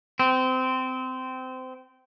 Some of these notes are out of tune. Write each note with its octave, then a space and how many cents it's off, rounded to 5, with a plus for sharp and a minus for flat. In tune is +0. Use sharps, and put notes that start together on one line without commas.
C4 -20